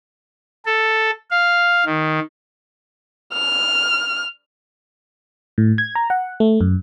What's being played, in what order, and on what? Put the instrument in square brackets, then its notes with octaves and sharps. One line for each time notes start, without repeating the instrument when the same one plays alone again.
[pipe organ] A4
F5
D#3
[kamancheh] F6
[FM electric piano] A2
G#6
A#5
F#5
A3
F#2